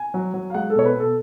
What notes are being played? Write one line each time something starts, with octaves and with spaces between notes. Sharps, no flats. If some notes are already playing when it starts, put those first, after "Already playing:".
Already playing: G#5
F#3
F#3
F5
G#3 F#5
A4
B2 C#5
B4
B2 A4